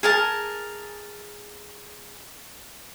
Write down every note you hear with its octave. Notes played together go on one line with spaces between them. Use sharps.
G#4 A#4 A5